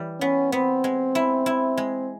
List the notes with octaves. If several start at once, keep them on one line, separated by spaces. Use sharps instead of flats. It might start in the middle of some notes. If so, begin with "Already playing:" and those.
Already playing: E3 G3
B3 C#4
B3 C4
G#3
E4
E4
G#3